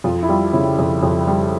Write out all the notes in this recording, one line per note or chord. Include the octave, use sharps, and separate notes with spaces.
F2 F4
E4
G3 F4
C#3 E4
F2
F2
G3